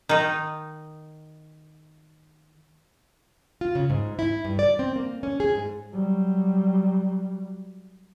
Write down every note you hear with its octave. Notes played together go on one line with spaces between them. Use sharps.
D#3 D#4
F4
C#3
G#2
E4
G2
D5
C4
A#3
C#4
G#4
G#2
F#3 G3